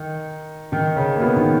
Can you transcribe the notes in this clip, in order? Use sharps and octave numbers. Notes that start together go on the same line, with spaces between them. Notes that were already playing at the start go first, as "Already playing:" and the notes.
Already playing: D#3 D#4
D#3 D#4
C#3 C#4
A#3
B2 B3
D#3 D#4